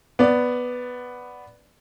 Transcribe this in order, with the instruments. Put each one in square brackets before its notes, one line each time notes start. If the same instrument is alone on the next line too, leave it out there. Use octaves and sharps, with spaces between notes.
[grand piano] B3 D5